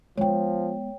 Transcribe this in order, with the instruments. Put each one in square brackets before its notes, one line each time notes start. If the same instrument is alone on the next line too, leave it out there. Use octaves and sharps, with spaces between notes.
[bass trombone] F3 [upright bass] G#3 B3 [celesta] C#5 G5